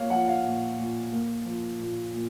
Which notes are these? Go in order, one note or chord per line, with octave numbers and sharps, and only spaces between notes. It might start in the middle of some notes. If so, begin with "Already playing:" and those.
Already playing: A#3 C#5 F5
F3 F#5
F5
A#2
A#2
A#3
F3
A#2
A#2